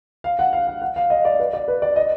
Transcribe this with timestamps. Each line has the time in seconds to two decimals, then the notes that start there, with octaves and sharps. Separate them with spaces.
0.24 F5
0.39 F#5
0.53 F5
0.67 F5
0.82 F#5
0.96 F5
1.10 D#5
1.25 D5
1.39 B4
1.53 D5
1.68 B4
1.82 D5
1.96 D#5